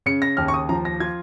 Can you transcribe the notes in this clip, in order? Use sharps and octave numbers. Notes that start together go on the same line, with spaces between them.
C#3 C#7
A#6
D#2 F6
C#6
D#6
F3 A#5
A#6
F4 G#6